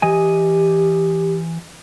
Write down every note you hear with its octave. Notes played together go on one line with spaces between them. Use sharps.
E3 G4 D#5 G#5